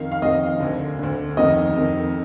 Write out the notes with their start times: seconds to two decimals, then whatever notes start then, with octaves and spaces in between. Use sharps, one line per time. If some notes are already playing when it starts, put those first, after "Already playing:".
Already playing: F2 D#3 F5
0.12 F5
0.22 F2 D#3 D#5
0.60 D2 D3
0.99 D2 D3
1.37 F2 D#3 D#5
1.76 F2 D#3